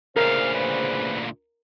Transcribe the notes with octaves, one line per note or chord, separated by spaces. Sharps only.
D2 A#2 C#3 A#4 C5 F5
B4